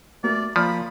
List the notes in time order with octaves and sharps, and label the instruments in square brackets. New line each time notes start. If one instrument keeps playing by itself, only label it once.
[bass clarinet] A3 [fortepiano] A#3 F#4 [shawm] D5
[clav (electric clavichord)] F3 [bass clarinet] A#3 [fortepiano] D5 [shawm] B5